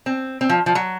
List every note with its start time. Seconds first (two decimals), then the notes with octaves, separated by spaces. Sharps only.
0.06 C4
0.41 C4
0.49 F3
0.66 F3
0.75 F#3